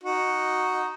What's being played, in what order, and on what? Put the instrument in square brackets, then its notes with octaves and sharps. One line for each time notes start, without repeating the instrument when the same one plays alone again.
[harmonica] D#4 F#4